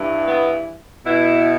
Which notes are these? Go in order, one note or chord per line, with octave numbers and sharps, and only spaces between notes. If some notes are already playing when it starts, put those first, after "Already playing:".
Already playing: G2 E3
B3
B2 E4